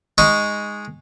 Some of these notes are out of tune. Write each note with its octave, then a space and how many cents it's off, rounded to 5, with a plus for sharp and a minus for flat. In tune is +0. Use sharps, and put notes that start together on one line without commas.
G#3 +0 D#4 +0 C#6 +0